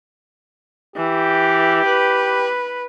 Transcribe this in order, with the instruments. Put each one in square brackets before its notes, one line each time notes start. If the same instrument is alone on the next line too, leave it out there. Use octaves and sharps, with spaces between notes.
[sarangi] E3 [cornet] G4
[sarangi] B4